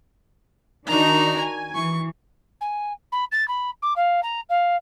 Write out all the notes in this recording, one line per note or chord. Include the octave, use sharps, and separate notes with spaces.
D#3 D4 D#4 F#4 A#5
G#5
E3 C#6
G#5
B5
A6
B5
D6
F5
A#5
F5